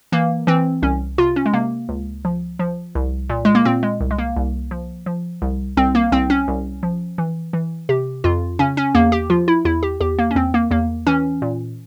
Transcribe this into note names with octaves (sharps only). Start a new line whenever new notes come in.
E3 A#3
E3 C4
C2 C#4
C3 F4
C#4
G#3
C3 A#3
C#2
F3
F3
C2
A#2
G#3
A#3
A#2 C4
G#3
C2
G#3
A#3
C2
F3
F3
C2
C2 C4
A#3
C2 C4
C#4
C2
F3
E3
E3
C3 G4
F2 F4
C#3 C#4
C#4
E2 A#3
G4
F3 F4
E4
E2 E4
G4
E2 G4
A#3
C#4
E2 C4
A#3
E2 A#3
E3 C#4
A#2